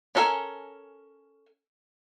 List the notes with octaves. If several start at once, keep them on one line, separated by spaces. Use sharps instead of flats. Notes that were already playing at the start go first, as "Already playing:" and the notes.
C#4 D4 A4 A#4 G#5